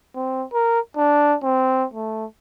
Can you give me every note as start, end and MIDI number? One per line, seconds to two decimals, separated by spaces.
0.15 0.45 60
0.53 0.80 70
0.97 1.36 62
1.43 1.85 60
1.94 2.25 57